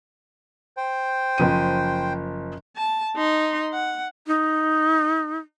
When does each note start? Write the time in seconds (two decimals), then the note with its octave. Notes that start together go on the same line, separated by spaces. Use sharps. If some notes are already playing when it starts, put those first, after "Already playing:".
0.77 C5 G5
1.38 F#1 F3 D#7
2.76 A5
3.17 D#4 C6
3.73 F#5
4.27 D#4